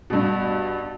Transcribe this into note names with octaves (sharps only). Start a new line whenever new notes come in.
G2 B2